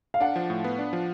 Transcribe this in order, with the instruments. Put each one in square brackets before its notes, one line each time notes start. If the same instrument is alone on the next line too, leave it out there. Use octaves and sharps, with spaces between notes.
[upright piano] F5
[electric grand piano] D4 [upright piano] F#5
[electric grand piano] F3
A2
B3
D4
F3